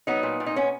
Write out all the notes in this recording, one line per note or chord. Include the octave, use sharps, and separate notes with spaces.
F#3 B3 D#4
A#2
A#2
D#4
B3 C#4